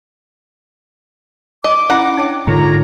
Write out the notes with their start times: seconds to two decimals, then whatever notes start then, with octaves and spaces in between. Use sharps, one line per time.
1.64 D#5 D6
1.90 C#4 E4 F#5 A#5
2.17 D4 C#5 G5
2.47 G#2 D3 D#4 F4 A#4 C#5 A#5